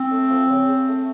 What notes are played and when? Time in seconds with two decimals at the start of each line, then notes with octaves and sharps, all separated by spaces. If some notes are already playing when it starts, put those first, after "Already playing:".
Already playing: C4
0.11 A3
0.30 F3
0.49 C#3
0.68 C#3
0.87 A3